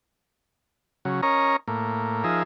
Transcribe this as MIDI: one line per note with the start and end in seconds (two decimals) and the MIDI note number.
1.05 1.21 49
1.05 1.21 54
1.23 1.56 61
1.23 1.56 70
1.23 1.56 73
1.23 1.56 75
1.23 1.56 82
1.68 2.24 45
1.68 2.24 58
2.24 2.43 53
2.24 2.43 63
2.24 2.43 68
2.24 2.43 70
2.24 2.43 76